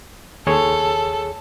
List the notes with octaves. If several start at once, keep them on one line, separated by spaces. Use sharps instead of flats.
D#2 G#4 A4 C#5